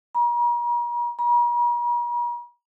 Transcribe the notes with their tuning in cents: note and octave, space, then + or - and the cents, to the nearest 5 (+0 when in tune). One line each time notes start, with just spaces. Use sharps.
A#5 +40
A#5 +45